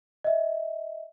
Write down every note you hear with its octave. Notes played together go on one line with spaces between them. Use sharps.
D#5 E5